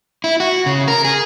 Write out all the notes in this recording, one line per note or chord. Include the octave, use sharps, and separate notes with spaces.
E4
F#4
C#3
A#4
G#4